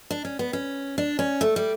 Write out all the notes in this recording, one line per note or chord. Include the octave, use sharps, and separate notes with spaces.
D4
C#4
B3
C#4
D4
C#4
A3
G3